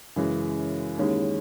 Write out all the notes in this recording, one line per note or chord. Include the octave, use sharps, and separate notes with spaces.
F#2 C#3 E3 G#3
D#2 D#3 G#3 C#4 E4